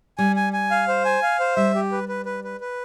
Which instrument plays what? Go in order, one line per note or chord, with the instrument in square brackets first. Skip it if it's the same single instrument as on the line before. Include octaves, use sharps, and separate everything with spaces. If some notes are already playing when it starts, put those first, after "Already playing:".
[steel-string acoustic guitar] G3 [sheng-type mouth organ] G#5
[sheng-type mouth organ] G#5
G#5
F5
C5
G#5
F5
C5
[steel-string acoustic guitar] G3 [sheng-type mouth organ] E5
[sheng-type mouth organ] G4
B4
B4
B4
B4
B4